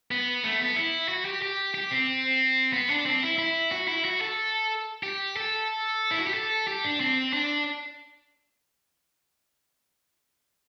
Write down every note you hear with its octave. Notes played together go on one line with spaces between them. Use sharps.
B3
A3
B3
E4
F#4
G4
G4
G4
C4
B3
D4
C4
E4
E4
F#4
E4
F#4
A4
G4
A4
E4
F#4
G4
A4
G4
D4
C4
D4